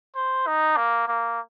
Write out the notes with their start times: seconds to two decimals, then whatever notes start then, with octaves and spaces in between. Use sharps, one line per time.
0.15 C5
0.47 D#4
0.77 A#3
1.08 A#3